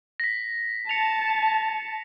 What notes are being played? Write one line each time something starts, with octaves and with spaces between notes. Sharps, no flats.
A#6 B6
A5 C#7 F7